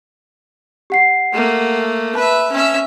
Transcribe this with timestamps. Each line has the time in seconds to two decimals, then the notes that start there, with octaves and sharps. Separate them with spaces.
0.90 G4 F#5 C7
1.33 A3 A#3
2.15 B4 E5 A5
2.52 C#4 E5